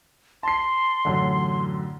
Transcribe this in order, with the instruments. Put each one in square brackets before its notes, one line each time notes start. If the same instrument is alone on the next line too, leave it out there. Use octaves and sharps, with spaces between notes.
[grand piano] A5 C7 [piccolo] C6
[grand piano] A1 F#2 D3